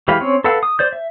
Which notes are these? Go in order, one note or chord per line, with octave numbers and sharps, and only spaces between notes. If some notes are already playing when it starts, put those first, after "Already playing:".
E3 G#3 G4 F5 B5
C4 C#4 C#5
A4 B4 F5 F#5 E6
D#6
C5 D5 G6
E5